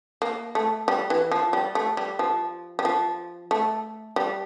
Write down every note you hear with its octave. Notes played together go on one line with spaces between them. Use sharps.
A#3
A3
G3
E3
F3
G3
A3
G3
F3
G3
F3
A3
G3